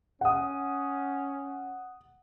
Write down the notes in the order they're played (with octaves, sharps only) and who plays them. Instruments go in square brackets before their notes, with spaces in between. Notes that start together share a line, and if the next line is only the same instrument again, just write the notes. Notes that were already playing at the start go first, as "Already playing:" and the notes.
[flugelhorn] C#4 [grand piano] F#5 D#6